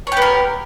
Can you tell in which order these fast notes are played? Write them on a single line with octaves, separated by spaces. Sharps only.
C#5 G4 B3 A#4